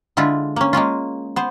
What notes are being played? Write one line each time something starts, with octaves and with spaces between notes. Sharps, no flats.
D3 G#3 E4 F4
A#3 C#4
G#3 A#3 C#4 F4
B3 C5